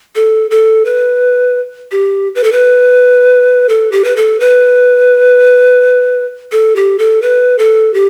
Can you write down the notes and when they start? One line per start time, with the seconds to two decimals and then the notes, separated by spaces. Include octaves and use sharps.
0.15 A4
0.51 A4
0.85 B4
1.92 G4
2.35 B4
2.44 A4
2.52 B4
3.69 A4
3.92 G4
4.04 B4
4.16 A4
4.40 B4
6.52 A4
6.76 G4
6.99 A4
7.22 B4
7.59 A4
7.94 G4